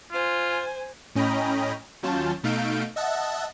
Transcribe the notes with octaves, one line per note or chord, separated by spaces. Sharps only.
F4 C5 G#5
A2 C#4 D#5 G5 A#5 B5
D#2 F#3 C#4 F4 A5 G6
B2 A3 D#4 F5 G6 D7
D#5 E5 F#5 A5